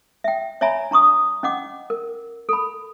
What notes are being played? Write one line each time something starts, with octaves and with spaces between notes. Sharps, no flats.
E5 G5
C#5 D5 E5 G#5 A#5 B5
D4 A#5 C#6 D#6
C#4 D#5 F#5 D6
A#4
A4 B5